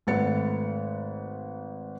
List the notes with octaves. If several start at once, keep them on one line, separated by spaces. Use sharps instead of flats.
G#1 A3 B4 F#5 A6 C#7